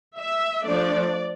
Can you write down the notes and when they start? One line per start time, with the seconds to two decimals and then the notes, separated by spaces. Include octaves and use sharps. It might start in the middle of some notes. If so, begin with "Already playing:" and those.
0.18 E5
0.66 F3 A3 D4 D5